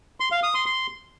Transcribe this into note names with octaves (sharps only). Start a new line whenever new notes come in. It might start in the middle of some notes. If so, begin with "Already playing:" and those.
C6
F5
D#6
C6
C6